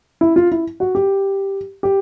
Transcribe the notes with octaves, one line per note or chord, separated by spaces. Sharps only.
E4
F4
E4
F#4
G4
G4